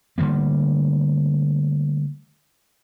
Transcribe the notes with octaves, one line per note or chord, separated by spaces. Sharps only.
D3 G3 A3 A#3